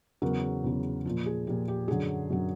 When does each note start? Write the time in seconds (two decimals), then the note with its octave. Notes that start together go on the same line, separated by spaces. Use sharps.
0.22 E2 C#3 F#3 A#4
0.64 E2 C#3 F#3
1.05 A#2 F3
1.26 G#4
1.47 A#2 F3 G4
1.68 G4
1.88 F#2 D3 F#3 G#4
2.30 F#2 D3 F#3